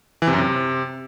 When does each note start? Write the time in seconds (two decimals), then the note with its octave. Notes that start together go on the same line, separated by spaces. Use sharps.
0.22 E3
0.27 C3
0.33 F#2
0.38 C3